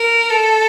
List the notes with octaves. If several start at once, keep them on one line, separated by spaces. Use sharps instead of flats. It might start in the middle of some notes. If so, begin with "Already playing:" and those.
Already playing: A#4
A4